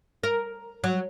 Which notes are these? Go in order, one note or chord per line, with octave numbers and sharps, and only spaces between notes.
A#4
F#3